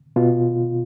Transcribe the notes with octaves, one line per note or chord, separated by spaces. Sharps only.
B2 F4